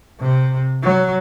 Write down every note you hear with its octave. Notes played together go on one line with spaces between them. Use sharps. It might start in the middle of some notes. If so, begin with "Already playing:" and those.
C3
F#3